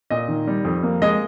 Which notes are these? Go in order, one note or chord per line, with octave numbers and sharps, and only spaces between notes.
A#2 D#5
D#3
G3
F2
A#3
G#3 D#5